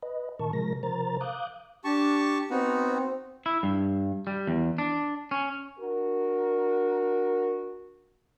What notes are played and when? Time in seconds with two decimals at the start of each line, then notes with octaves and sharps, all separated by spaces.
0.03 B4 D#5
0.39 A#2 D#3 A#4 A5 C#6
0.53 C3 F3 G#3 A#4 A#6
0.83 C3 F3 A#4 C5 A#5 A6
1.21 F5 D6 D#6 F#6 G6
1.84 D4 G4 A5 C#6
2.50 B3 C4 D#4 F#4
3.46 E4
3.63 G2
4.27 G3
4.47 E2
4.78 D4
5.31 C#4
5.80 D4 F#4 A#4